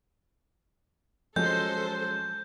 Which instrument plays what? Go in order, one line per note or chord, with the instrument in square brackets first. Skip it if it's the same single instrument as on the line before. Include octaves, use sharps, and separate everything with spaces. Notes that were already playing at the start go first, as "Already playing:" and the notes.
[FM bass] F3 [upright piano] F#3 G#3 C#4 [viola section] A4 C5 [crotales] G6